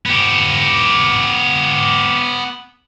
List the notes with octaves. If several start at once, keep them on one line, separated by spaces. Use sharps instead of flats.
B3 G4